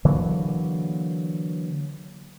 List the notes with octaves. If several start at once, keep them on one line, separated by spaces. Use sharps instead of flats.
D3 E3 F#3 A#3